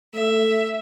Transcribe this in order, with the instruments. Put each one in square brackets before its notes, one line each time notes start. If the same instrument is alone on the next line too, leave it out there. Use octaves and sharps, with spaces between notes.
[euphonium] A3 [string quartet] E5